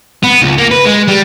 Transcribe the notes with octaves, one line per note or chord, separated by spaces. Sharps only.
B3
C#2
A#3
B4
G#3
G3